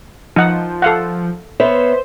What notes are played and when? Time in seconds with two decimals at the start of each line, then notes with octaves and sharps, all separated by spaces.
0.36 F3 D#4 F#5
0.82 A4 F5 F#5
1.60 B3 C5 C#5 E5